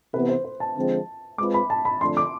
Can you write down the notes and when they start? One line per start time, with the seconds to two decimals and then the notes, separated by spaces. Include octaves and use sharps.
0.14 C3 E3 B3 E4 B4
0.29 C5
0.45 C5
0.60 A5
0.77 D3 F3 G#3 C4
1.38 G#3 C4 F4 B4 D6
1.54 B5
1.70 A5
1.85 B5
2.01 F2 D3 A3 D4 C6
2.17 D6